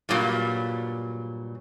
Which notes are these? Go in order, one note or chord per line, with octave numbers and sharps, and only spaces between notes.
G2 A#2 F#3 G3